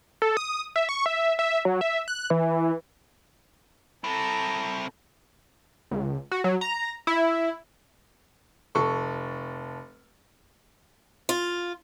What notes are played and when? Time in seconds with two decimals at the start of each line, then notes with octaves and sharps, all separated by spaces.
0.22 A4
0.37 D#6
0.76 E5
0.89 C#6
1.06 E5
1.39 E5
1.65 F#3
1.81 E5
2.08 F#6
2.30 E3
4.04 C4 E4 A4 A#5
5.91 C#2
6.31 F#4
6.44 F#3
6.61 A#5
7.07 E4
8.75 F1 A4 C#6
11.29 F4